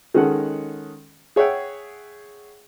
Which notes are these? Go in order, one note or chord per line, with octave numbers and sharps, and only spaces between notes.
D#3 G#3 C#4 A4 F#5
G#4 C#5 E5 F#5 G5